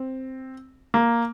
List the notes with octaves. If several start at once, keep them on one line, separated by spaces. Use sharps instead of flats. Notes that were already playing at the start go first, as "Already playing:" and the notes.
Already playing: C4
A#3